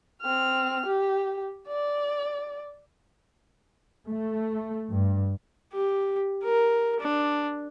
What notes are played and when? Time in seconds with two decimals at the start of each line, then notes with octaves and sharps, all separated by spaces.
0.22 C4 F6
0.86 G4
1.68 D5
4.08 A3
4.91 G2
5.73 G4
6.44 A#4
7.00 D4